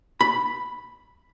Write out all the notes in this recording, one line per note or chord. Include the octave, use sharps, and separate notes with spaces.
B5